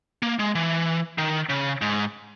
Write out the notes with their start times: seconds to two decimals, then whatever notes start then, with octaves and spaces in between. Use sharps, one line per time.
0.22 A#3
0.39 G#3
0.55 E3
1.18 D#3
1.49 C#3
1.82 G#2